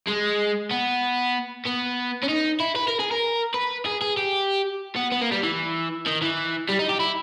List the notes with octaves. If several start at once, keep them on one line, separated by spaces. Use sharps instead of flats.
G#3
B3
B3
C#4
D#4
E4
B4
A#4
G#4
A#4
B4
G#4
G#4
G4
B3
B3
A#3
G3
E3
D#3
E3
G3
D#4
G4
E4